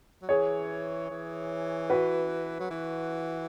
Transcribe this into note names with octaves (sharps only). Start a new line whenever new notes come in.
F#3
E3 G#4 C#5
E3
F#4 B4
F#3
E3